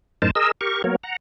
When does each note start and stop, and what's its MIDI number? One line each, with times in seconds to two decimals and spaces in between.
0.22 0.31 42
0.22 0.31 45
0.22 0.31 63
0.22 0.31 70
0.22 0.31 72
0.22 0.31 81
0.35 0.51 68
0.35 0.51 70
0.35 0.51 75
0.35 0.51 88
0.61 0.82 67
0.61 0.82 70
0.61 0.82 85
0.84 0.96 54
0.84 0.96 58
0.84 0.96 59
0.84 0.96 70
0.84 0.96 73
1.03 1.16 78
1.03 1.16 82